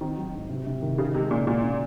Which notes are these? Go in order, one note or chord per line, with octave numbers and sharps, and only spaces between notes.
D#3 C4
F#3
G#2
C3
C3
D#3
C#3 D#4
C3 G#3
A#2 C#3
A#2 F#4
C#3